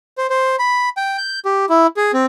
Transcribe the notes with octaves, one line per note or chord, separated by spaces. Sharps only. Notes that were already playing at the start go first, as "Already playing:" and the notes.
C5
C5
B5
G5
G6
G4
E4
G#4
C4